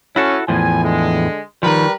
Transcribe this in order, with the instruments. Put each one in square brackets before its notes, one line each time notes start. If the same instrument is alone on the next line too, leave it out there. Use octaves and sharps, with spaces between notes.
[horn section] C#4 [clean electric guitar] E4 F#4 A4
[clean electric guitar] E2 A2 F3 [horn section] G#5
[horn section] D3 G#3
[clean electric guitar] D#3 F3 [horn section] G3 A#4 B4